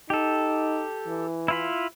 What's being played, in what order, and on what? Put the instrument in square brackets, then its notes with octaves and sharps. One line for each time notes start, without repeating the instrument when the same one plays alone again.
[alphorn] D#4 [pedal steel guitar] G4 A4
[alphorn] E3
[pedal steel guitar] E4 F4 B5